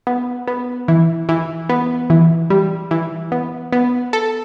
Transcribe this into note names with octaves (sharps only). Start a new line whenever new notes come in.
B3
B3
E3
E3
B3
E3
G3
E3
B3
B3
A4